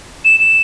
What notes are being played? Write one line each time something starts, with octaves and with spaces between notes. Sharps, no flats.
E7
E7